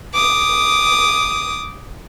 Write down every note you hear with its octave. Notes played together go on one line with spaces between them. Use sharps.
D6 D#6